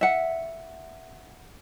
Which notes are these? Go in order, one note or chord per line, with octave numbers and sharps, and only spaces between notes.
E5 F#5